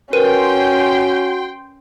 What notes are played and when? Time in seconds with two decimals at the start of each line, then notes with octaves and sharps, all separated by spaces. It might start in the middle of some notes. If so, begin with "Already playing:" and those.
0.13 C#4 F#4 A#4 B4 G5 C6 D#7